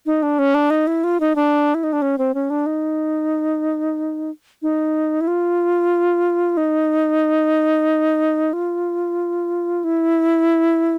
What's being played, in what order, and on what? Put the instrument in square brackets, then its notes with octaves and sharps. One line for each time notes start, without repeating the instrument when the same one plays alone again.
[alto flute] D#4
D4
C#4
D4
D#4
E4
F4
D#4
D4
E4
D#4
D4
C#4
C4
C#4
D4
D#4
D#4
E4
F4
D#4
F4
E4